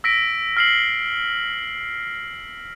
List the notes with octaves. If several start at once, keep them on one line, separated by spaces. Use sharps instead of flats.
E6 A#6 B6 D7
F6 C7 F#7